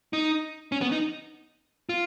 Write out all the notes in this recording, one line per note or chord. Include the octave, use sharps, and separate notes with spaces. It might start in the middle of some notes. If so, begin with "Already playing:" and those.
D#4
C#4
B3
D#4
F4